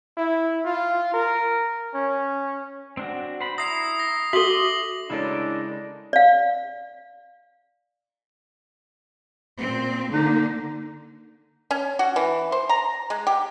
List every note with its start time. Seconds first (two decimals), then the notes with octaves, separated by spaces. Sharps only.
0.17 E4
0.65 F4
1.13 A#4
1.94 C#4
2.97 C4 D4 F#4
3.40 C5 B5
3.58 E4 E5 A#5 D#6 C7
3.99 A#6
4.33 F#4 A4 E5 D6 D#6 F#7 G7
5.10 C#3 G#3 C#4 D4 E4 A4 A#4
6.13 D5 F5
9.59 A#2 C4
10.13 D3 A#3 D#4
11.71 C#4
11.99 F#4
12.16 E3
12.52 C5
12.69 A#5
13.10 G#3
13.27 G4